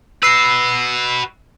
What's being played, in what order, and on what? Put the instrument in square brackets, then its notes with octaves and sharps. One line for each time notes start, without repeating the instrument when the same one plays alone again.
[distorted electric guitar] F#4 B4 [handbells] E6 C7